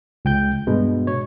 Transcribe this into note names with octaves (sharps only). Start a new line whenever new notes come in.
C#2 G5 G6
G2 B2 G#3
C#5